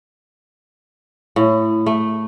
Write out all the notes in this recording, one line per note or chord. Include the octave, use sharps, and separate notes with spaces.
A2
A3